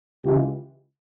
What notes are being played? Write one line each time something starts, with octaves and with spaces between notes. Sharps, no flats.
C#2 C#3 E3 G#3 F4 G4